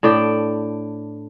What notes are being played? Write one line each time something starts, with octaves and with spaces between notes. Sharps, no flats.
A2 D4 D5 G5